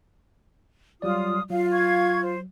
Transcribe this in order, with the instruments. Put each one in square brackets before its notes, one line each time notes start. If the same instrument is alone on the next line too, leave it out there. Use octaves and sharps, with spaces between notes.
[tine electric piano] F#3 G3 D5 [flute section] F4 D#6
[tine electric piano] F#3 [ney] F4 [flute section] F5
[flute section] F5 C#6 G#6
C5